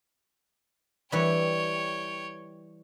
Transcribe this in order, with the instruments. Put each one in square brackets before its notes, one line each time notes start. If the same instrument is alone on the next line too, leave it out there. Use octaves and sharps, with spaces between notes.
[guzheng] E3 G3 [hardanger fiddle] C#5 G5